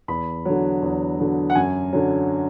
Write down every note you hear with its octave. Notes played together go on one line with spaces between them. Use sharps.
E2 B5
D3 F#3
E2
D3 F#3
F#5
F#2 G#5
D3 F#3